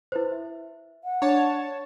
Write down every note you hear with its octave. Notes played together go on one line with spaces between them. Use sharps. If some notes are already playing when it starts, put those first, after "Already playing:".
E4 B4 C5
E5
F#5
D4 C#5 A5